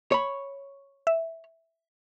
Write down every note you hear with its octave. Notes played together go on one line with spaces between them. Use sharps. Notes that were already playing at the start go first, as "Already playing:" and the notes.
C#5 B5
E5